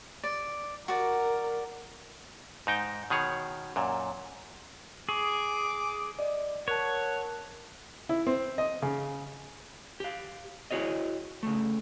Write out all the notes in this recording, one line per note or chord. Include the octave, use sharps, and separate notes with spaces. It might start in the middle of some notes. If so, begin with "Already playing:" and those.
D5
F#4 A#4 D5
G#2 D#4 G5
B2 D#3 G#4 C#5
F#2 A#2
G#4 C#6 D6
D5 D#5
A#4 C#5 F#5 A5
E4
C4
D#5
C#3
G4 F5
E4 F#4 G#4 C#5 D#5
C#3 A3